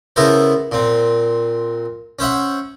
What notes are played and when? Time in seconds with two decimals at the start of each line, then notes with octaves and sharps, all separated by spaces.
0.16 C#3 B3 E4 A4 A#4 C5
0.71 A#2 C4
2.19 C#4 C5 E5 F#5